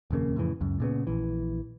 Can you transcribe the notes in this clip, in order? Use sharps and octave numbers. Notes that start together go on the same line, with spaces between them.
D#1 F2 C#3 A#3
F2 A2 C#3 E3
C#2 F#2
A#2 C#3 B3
A#1 E3